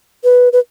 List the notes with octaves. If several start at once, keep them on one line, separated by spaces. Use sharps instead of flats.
B4
B4